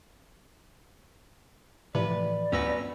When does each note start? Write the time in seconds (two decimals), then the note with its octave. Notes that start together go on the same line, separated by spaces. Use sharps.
1.95 A2 C3 E3 F3 B4 D5
2.52 D2 G2 B3 C#4 F#4 B4 E6 A#6